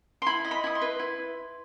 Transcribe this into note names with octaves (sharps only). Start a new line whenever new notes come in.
C6
E4 B5
D#5
B5
E4 D#6
C6
B4
E4